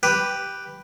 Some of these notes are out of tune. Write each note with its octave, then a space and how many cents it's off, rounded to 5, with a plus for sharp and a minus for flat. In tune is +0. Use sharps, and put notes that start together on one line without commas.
G4 +0 B4 +0